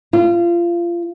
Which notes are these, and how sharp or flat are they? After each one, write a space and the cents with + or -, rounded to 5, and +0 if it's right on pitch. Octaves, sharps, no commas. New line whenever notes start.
F4 -25